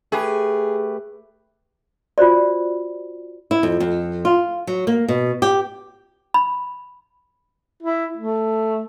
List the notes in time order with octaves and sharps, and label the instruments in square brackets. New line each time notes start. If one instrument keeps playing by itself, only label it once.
[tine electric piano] A3 G4 B4 [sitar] G#4
[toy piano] F4 F#4 C5 D5
[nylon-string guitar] E4
F2
F2
F4
F#3
A#3
B2
G4
[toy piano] B5
[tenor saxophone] E4
A3